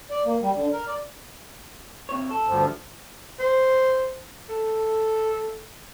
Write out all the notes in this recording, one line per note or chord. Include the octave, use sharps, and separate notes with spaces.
D5
A#3
G3
D3
A#4
D5
C3 C#5
A4
D2 G2 F3
C5
A4